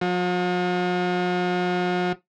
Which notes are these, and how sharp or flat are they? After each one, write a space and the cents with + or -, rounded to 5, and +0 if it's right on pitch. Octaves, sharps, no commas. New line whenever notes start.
F3 +45